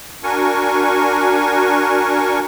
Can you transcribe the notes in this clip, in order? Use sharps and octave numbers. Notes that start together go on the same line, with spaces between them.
D4 F#4 A#4 G#5 C#6